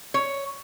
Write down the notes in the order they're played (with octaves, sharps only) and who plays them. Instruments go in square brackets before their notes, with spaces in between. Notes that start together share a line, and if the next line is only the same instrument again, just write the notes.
[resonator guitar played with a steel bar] C#5